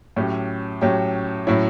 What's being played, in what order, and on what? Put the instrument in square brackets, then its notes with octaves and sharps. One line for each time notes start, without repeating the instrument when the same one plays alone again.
[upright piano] A2 F#3 C#4 G4
A2 F#3 C#4 G4
A2 F#3 C#4 E4